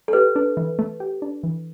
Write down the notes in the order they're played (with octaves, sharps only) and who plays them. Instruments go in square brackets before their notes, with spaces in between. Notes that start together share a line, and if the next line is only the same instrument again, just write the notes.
[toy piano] A4
[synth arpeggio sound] G4 [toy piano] B4
[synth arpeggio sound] D4
E3
A3
G4
D4
E3